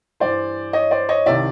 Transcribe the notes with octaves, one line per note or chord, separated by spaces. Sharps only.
G2 E3 C5 D5
C#5 D#5
C5 D5
C#5 D#5
C2 C3 D#3 D5 E5